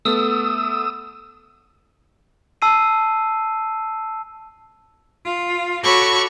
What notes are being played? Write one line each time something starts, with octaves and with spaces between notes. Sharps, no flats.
A3 B3 A4 D#6 E6
A5 E6 C7 D#7
F4
F#4 A4 C#5 B5 C#6 D6